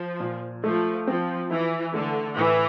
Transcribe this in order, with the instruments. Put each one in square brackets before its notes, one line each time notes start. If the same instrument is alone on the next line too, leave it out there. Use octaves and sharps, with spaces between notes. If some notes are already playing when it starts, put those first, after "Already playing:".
Already playing: [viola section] F3
[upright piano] A#2
[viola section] F3 [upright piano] A3
[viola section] F3 [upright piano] C4
[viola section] E3 [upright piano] E4
[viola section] D3 [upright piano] A3
[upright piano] A2 [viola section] E3